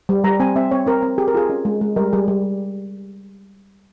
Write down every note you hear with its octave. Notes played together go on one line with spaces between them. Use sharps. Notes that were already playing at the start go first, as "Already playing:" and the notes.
G3
G3 A#5
C4 G#5
C4 E5
C4 C#5
C4 A#4
C4
G4 G#4
A#4
F4 G#4
C#4
G#3
G#3
G3 A#4
G3 G#4
G3